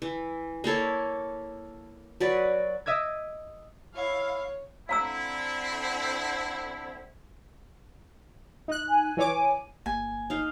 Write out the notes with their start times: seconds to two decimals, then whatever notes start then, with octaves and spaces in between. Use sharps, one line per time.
0.02 E3
0.64 A#3 E4 A4 C#5
2.20 F#3 B4 D5
2.86 D#5 E5 D6 G#6
3.95 E4 C#5 F5
4.89 D3 C4 E4 F5 A#5 E6
8.68 D#4 F#6
8.88 G#5
9.17 E3 C#5 D6
9.86 G1 A#3 G#5
10.30 D#4 F5